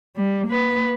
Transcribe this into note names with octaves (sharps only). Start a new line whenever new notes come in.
G3
A#3 B4